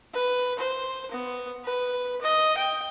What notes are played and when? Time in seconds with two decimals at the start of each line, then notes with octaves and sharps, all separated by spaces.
0.14 B4
0.59 C5
1.11 B3
1.65 B4
2.22 D#5
2.58 G5